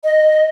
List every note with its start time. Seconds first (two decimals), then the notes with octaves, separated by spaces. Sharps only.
0.04 D#5